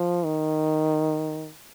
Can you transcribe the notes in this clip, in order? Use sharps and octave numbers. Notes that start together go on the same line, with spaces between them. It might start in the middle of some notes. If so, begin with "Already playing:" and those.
Already playing: F3
D#3